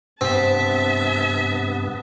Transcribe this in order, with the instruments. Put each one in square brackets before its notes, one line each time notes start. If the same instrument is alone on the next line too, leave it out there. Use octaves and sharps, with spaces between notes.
[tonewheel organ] G2 C3 B3 [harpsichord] C4 [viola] E5 A5